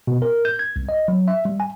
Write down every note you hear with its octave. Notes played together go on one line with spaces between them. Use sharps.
B2
A#4
G6
G#6
C2
D#5
F#3
E5
G3
G#5